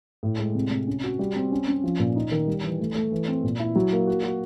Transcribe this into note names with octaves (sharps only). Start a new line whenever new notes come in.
A2
G#3
C3
C3
C#4
F#4
G3
C4
C#4
C#4
F3
A#2
D#4
D#3
G3
E3
A3
A3
E3
C4
A#2
E4
F#3
A#3
F#4
F#4